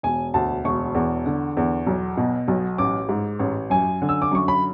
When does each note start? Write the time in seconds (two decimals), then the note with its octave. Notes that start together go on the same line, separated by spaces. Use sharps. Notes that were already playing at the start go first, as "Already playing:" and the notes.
0.03 E1 G#5
0.34 D2 A5
0.65 E1 C#6
0.95 E2
1.26 D3
1.57 E2
1.87 B1
2.17 B2
2.48 B1
2.78 A1 D6
3.09 G#2
3.39 A1
3.70 F#2 G#5
4.02 D3
4.09 E6
4.22 D6
4.32 F#2 C#6
4.48 B5